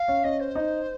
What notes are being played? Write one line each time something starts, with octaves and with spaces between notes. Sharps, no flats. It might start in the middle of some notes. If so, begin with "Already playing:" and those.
Already playing: F5
C#4
C#4 D#5
C5
D#4